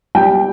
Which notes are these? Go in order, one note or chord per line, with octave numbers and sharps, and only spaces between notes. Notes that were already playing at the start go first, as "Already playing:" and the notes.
G3 G5